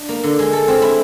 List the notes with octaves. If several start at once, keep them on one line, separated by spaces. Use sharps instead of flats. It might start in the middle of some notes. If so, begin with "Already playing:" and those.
Already playing: D4
A#3
D3
G#3
A4
C4
E4